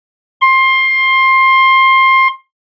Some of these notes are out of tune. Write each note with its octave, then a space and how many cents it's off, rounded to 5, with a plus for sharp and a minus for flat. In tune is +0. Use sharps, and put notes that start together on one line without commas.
C6 +20